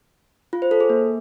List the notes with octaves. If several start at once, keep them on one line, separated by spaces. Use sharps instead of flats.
F4
C5
A4
G#4
A#3